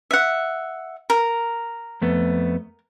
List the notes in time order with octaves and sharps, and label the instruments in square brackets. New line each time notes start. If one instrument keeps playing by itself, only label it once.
[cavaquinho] E5 F#5
A#4
[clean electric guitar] F2 A3 B3